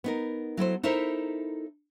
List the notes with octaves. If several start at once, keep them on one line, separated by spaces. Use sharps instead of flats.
B3 D#4 A#4
F#3 E4 A4 C5
D#4 E4 A4 A#4 C5 E5